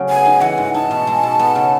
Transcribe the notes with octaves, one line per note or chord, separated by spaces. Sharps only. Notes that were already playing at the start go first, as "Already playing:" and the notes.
Already playing: C#3 F#3 A3
B3 G#5
D#4
E3 F#5
G#2
D#4 A5
B2
G#3
B2
B3
C#3